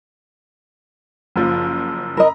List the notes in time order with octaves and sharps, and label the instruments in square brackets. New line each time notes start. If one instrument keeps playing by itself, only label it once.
[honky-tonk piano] F#1 F3
[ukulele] A#4 D#5 [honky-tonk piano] A#5 B5